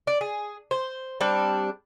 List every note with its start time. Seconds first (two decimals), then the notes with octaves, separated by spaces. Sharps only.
0.07 D5
0.21 G#4
0.71 C5
1.21 G3 C4 D4